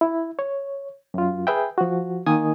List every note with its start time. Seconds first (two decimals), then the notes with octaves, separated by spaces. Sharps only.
0.01 E4
0.39 C#5
1.14 F#2 F4
1.47 G#4 B4 E5 G5
1.78 F3 F#4
2.26 D#3 A#3 G#5 D#6